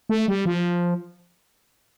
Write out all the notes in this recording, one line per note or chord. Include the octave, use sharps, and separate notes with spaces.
A3
G3
F3